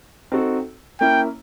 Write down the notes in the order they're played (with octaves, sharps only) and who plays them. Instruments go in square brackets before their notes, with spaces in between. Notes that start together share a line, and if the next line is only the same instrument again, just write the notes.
[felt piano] C4 D#4 F#4 A4
[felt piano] A#3 C#4 E4 [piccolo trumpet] G5